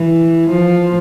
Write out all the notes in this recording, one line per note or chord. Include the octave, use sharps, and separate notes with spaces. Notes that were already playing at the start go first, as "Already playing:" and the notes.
Already playing: E3
F3